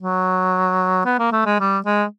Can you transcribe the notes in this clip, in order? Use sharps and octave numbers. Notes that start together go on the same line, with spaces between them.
F#3
B3
A#3
A3
G#3
G3
G#3